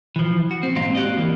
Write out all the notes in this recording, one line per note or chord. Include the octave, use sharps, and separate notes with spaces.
E3 F3
F#4
C4
G#2 A#3 C4 D#5 F5
F#4 G4 D5 D#5
E2 E3 A#3